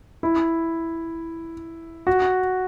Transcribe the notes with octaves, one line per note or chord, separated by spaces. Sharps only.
E4
F#4